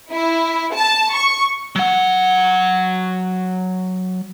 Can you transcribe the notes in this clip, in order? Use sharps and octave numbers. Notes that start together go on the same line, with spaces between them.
E4
A5
C#6
F#3 F#5